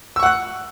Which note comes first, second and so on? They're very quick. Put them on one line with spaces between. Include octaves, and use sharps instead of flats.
E6 C#6 F#5 F#6